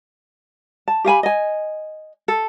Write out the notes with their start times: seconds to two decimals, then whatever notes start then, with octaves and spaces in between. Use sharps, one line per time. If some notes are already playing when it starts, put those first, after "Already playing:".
0.88 A5
1.04 G4 F5 G#5 B5
1.23 D#5 G#5
2.28 A4